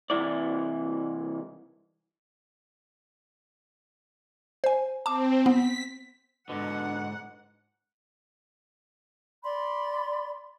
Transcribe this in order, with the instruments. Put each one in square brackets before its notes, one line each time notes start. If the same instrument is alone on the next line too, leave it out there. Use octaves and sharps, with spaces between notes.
[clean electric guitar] C2 A#2 E3 E4 D5
[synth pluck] C5 G#5
[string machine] C4 [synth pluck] A5 D6
[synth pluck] B3 [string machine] B6
[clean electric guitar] G#2 D3 [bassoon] B2 [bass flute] D4 [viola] F#5
[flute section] D5 B5 C6